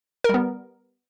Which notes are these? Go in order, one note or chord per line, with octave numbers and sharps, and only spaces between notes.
G3 B3 A#4